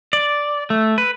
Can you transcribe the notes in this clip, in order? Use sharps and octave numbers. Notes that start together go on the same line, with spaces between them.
D5
A3
B4